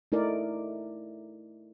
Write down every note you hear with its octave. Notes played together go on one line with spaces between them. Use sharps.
A3 D#4 E4 A#4 D5